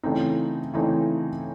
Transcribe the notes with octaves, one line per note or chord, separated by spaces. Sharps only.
C#3 E3 A3 C4 D#4
C#3 E3 A3 C4 D#4